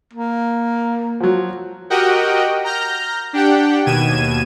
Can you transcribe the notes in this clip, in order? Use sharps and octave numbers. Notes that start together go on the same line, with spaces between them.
A#3
F3 F#3
F#4 G4 A#4 D#5 F#5 G5
A#5 F6 G6 A#6
D4 G4 F#5 G5
D#2 B2 G#6 D#7 E7